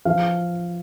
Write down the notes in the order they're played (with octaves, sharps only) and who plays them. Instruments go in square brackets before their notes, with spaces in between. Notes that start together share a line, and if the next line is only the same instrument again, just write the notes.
[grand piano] F3 F5